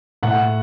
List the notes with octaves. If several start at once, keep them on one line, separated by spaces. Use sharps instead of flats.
A2 F#5